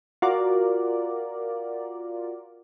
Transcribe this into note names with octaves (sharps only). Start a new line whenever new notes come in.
F4 F#4 A#4 D5